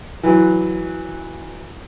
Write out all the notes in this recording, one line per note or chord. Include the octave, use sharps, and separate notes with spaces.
E3 F#3